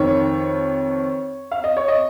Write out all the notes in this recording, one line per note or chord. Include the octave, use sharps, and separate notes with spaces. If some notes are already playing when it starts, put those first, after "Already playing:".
Already playing: F2 D#3 C#5
F5
D#5
C#5
D#5